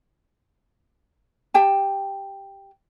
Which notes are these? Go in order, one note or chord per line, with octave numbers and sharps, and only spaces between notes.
G4 G5 A5